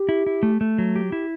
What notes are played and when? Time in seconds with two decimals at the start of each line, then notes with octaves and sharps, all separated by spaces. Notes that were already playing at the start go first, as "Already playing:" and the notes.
Already playing: G4
0.09 E4
0.26 E4
0.43 A3
0.61 A3
0.78 F#3
0.96 G4
1.12 E4